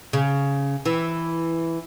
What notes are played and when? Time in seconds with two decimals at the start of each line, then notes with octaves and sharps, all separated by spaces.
0.13 C#3
0.86 E3